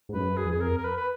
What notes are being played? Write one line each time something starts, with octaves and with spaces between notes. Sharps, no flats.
G#2
F#2 B4
G#4
F2
G#4
A#4
A#4
B4
B4